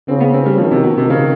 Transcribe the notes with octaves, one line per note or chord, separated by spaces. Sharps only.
C#3 C4
B3
C4
G3
D#3 F3
C3
B2
C3
C#3